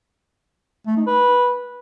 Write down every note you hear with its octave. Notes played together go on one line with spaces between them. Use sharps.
A3
D#4
B4